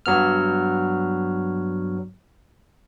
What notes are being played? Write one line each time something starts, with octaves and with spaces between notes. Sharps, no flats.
G2 F#3 B3 F6